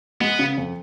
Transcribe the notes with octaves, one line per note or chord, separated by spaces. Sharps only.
G#3 B3
C#3
F2